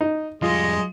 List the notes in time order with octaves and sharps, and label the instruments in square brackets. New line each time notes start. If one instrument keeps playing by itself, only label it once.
[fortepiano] D#4
[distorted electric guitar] F2 G3 [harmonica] G#3 D#5 [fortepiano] F4